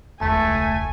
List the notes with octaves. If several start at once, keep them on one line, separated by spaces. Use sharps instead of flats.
E1 C#2 A3 G#5 A5